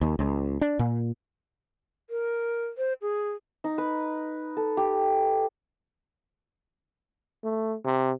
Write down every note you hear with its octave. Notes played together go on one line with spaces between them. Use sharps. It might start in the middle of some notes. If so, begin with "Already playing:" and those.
D#2
C#2
D4
A#2
A#4
C5
G#4
D#4
B4
A4
G4
A3
C3